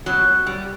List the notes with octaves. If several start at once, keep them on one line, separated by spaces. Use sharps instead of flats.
B2 F#3
G3